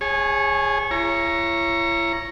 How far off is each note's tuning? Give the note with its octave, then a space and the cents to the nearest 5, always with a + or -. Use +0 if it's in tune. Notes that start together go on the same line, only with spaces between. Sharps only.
G#4 -15 C#5 -15 G#5 +40
E4 +40 C#5 +0 A#5 +5